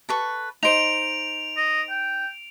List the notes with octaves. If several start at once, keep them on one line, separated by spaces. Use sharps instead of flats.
A4 B4 C#6
D#4 C5 D7 F7
D#5
G5